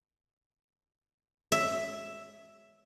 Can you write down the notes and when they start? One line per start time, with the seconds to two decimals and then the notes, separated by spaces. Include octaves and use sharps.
1.52 E5